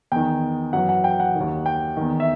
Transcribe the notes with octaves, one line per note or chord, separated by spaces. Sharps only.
E2 D#3 G5
F#2 E3 F#5
F#5
G5
F#5
D#2 D#3
G5
E2 D#3
E5